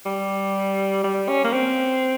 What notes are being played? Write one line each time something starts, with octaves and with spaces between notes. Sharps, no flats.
G3
G3
C#4
A#3
C4